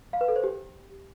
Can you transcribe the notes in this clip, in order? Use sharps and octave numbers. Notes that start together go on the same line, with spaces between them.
F5
B4
A4
C5
G4